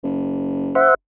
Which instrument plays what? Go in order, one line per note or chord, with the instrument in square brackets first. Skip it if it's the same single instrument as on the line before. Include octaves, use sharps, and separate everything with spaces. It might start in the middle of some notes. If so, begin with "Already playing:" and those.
[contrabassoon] F#1
[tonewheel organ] C5 E5 F#5